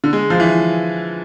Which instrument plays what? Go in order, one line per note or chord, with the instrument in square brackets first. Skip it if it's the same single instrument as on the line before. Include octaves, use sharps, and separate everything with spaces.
[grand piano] D3
G#3
F3
E3